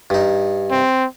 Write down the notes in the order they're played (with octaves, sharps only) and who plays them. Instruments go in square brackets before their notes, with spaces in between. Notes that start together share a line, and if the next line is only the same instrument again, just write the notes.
[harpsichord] G2 D#4
[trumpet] C4